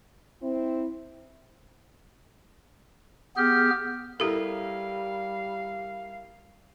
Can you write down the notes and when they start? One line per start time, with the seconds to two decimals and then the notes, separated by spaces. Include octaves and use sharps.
0.43 C4 E4
3.37 B3 G4 G#4 F6
4.20 G3 E4 G4 A4 A#4 F5